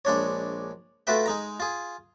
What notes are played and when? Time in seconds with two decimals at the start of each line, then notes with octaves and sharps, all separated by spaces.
0.05 A#1 G#3 D4 C#5
1.07 A3 F4 F#4 B4 E5 G5
1.26 G#3 D#4 A#5
1.60 F4 G#4